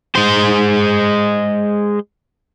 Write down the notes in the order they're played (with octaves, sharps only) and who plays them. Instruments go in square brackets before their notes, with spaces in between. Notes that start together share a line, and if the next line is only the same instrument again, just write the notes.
[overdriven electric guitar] G#3 C5